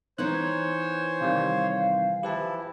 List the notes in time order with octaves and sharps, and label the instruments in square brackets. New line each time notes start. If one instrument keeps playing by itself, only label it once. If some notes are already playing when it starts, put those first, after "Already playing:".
[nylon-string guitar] E3 B3 D#4 [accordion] C5 C#5 [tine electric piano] F#6
[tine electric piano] C3 D#3 G3 [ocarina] F5
[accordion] F3 E4 [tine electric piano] G4 B4 A5